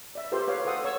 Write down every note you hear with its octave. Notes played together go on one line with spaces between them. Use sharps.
D5 E5
F4 G4 A4 B4 C5 C6
B4 C#5 F5
A4 C5 F5 F#5 D#6 E6
C#5 C#6 E6